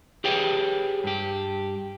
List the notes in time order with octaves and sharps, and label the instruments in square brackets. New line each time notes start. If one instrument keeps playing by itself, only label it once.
[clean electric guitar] G4 G#4 B4 C#5 G5
G2 G4